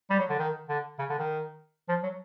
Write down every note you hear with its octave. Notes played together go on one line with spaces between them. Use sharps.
G3
F#3
D3
D#3
D3
C#3
D3
D#3
F3
F#3